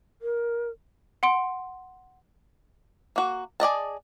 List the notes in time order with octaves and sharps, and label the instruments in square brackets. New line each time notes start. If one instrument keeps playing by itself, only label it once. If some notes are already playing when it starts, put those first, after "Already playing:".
[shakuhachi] A#4
[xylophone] F#5 C6 D7
[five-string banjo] A#3 F#4
G#4 D5 D#5 A5